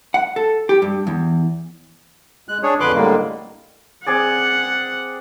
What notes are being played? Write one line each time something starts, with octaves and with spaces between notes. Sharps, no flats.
F#5
A4
G4
G2
E2
G#3 F#6
D4 G#4 C#5
F2 D3 B4 C6 D6 F#6
A2 D3 G3 G#3 A#3
C4 G#4 D5 F#5